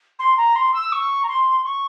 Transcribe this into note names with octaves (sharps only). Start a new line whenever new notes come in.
C6
A#5
C6
E6
C#6
A#5
C6
C#6